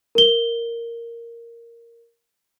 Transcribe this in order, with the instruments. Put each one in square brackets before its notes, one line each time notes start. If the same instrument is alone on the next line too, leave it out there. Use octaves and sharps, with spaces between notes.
[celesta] A#4 G7